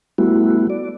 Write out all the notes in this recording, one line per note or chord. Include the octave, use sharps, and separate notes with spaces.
G3 A3 B3 E4 F#4
D5